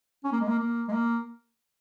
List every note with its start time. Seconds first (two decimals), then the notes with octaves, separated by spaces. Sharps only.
0.24 C#4
0.32 A#3
0.41 G#3
0.48 A#3
0.59 A#3
0.88 G#3
0.93 A#3